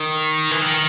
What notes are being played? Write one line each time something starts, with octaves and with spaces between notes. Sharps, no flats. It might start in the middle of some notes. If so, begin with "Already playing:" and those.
Already playing: D#3
E3
D#3